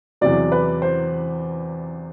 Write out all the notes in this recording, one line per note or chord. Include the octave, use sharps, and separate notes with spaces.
E2 C3 F#3 D5
B4
C5